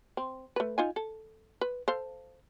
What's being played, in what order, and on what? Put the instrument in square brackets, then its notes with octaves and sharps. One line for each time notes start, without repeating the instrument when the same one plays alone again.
[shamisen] C4
A3 B4
D#4 F4 G#5
A4
B4
A4 C5 F5